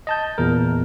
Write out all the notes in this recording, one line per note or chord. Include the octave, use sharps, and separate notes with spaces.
D#5 A5 G6
E2 A#2 A#4